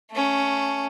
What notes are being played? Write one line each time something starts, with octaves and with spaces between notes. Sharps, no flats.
A3 C#4